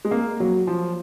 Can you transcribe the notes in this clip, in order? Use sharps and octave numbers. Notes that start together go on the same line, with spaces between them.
G#3
A#3
F#3
F3